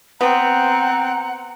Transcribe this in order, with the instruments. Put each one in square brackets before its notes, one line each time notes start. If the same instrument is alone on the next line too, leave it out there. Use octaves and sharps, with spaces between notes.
[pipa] B3 [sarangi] C4 [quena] F#5 [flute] A#5